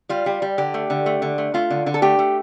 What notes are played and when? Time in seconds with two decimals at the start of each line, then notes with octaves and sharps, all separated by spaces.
0.09 G3 F4
0.26 G3
0.42 G3
0.58 D3 G4
0.74 A3
0.90 D3
1.06 A3
1.22 D3
1.38 A3
1.54 A3 F4
1.70 D3
1.86 D3
1.94 A4
2.02 A3 G4
2.19 A3